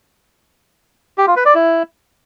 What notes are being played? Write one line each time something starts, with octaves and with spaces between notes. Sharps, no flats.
G4
F4
B4
D5
E4